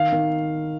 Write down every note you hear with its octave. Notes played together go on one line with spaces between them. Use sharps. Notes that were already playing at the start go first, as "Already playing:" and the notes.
Already playing: D#3 F5
D#3